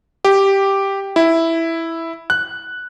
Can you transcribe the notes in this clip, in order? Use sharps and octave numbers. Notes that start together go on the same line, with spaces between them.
G4
E4
F#6